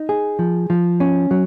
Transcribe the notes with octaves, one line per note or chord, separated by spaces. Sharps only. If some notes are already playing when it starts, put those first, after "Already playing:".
Already playing: D#4
G#4
F3
F3
C#4
F#3